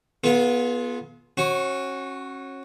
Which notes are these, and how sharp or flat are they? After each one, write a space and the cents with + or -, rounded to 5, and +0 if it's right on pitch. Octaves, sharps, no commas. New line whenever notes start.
B3 -20 F4 +0 G#4 +35
C#4 -30 F#4 +0